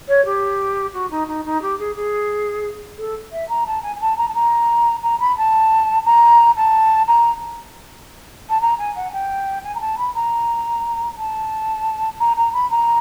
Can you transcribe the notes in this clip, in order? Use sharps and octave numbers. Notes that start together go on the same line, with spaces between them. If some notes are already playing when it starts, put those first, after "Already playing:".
C#5
G4
F#4
D#4
D#4
D#4
G4
G#4
G#4
A4
E5
A#5
A5
G#5
G#5
A5
A#5
A5
A#5
A#5
B5
A5
A#5
A5
A#5
A5
A#5
G#5
F#5
G5
G#5
A#5
A5
B5
A#5
A5
A#5
A#5
B5
A#5